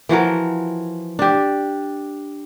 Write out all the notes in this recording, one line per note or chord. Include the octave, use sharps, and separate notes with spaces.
E3 F3 F#4 A#4
D4 G4